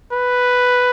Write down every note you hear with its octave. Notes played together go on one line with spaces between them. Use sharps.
B4